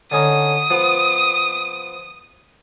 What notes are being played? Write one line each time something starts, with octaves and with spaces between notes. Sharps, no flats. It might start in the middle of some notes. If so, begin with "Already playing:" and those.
D3 C#4 D#4 D#6
F3 B3